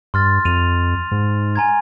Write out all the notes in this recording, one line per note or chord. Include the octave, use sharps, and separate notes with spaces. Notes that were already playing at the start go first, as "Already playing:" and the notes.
G2 C6 F6 A6
F2 D#7 F7
G#2
G#5 A#5 G#6